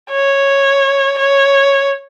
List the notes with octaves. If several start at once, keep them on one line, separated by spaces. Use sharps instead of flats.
C#5
C#5